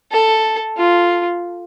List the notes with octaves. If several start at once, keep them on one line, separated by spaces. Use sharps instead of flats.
A4
F4